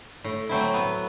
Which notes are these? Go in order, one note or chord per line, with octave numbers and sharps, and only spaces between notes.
A2
F#3 A3 C4 E4
B3